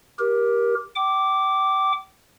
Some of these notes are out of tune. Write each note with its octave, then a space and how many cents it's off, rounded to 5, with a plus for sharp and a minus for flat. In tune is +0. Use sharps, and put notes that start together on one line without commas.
G4 +0 A#4 +20
G5 -35 D6 +0